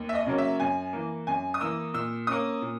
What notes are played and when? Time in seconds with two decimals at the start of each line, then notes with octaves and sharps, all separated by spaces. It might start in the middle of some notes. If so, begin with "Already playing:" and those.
Already playing: D#2
0.09 E5
0.15 D#5
0.26 C#3 F#3 A#3 C#4
0.38 E5
0.60 F#2 G#5
0.93 E3 A#3
1.27 F#2 G#5
1.54 D#6
1.61 E3 A#3 E6
1.94 A#2 E6
2.27 A#3 C#4 D#6
2.62 A#2